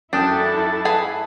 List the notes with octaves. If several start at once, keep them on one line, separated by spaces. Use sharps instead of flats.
F#2 D4 E4 A4 G5 A5 D#6
G#4 B4 G#5